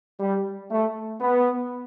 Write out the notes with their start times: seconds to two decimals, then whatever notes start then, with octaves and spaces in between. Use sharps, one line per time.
0.20 G3
0.70 A3
1.21 B3